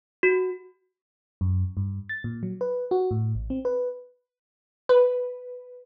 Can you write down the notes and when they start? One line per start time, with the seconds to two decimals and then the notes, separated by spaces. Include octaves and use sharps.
0.23 F#4
1.41 F#2
1.77 G2
2.09 A6
2.24 A#2
2.43 F#3
2.61 B4
2.91 F#4
3.11 A2
3.35 A1
3.50 C4
3.65 B4
4.89 B4